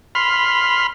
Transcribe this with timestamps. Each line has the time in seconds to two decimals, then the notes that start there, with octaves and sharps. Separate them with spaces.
0.15 B5 C6 F6